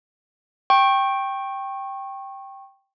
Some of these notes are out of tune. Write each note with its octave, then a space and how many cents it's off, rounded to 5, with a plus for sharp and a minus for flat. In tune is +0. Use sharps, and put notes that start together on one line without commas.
G5 +0 C#6 -25